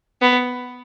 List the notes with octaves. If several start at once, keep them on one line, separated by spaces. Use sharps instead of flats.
B3